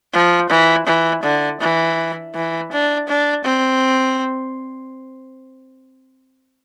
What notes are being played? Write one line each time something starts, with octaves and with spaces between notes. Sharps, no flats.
F3
E3
E3
D3
E3
E3
D4
D4
C4